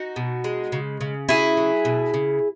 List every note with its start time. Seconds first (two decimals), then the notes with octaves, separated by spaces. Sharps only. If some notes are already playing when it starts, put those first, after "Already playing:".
Already playing: D#4 F#4
0.16 B2
0.44 G#3
0.72 C#3
1.01 C#3
1.29 F#3 E4 G#4
1.57 F#3
1.85 B2
2.14 C#3